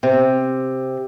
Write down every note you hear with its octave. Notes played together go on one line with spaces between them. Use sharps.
C3